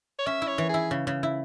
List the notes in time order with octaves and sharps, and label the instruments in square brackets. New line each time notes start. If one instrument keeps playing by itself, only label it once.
[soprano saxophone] C#5
[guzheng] C#4 [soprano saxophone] E5
[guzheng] E4
[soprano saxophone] C#5
[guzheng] E3
[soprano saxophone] G#4
[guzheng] E4
C#3
C#3
E4